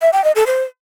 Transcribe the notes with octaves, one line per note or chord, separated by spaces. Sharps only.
E5
G5
D#5
A4
C5